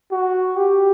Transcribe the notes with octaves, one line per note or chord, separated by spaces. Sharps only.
F#4
G4